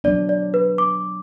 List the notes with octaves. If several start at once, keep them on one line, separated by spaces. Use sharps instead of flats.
F#3 B3 D4 D5
D5
B4
D6